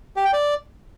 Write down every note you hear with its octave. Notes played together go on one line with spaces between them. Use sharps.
G4
G5
D5